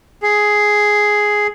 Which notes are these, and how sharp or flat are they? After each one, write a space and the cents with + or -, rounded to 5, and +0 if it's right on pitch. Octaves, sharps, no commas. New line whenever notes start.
G#4 +5